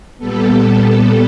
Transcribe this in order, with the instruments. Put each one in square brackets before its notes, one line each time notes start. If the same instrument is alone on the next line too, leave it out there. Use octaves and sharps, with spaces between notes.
[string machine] A#2 G3 B3 A4